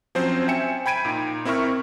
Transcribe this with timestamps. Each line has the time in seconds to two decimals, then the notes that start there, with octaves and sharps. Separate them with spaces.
0.15 F3 F#3 C4 C#4 C5
0.48 E5 G5 G#5 C#7 E7
0.86 G5 B5 G#6 D7 D#7
1.05 A#2 D#4
1.45 C4 E4 A#4 E5 C#6 F6